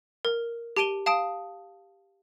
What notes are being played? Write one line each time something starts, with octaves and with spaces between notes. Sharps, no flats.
A#4
G4 A5 D7 D#7 G7
F5 A5 D#6 D7